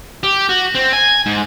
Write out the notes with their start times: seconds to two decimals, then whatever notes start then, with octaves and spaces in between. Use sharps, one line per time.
0.23 G4
0.49 F#4
0.75 C4
0.93 G#5
1.26 G#2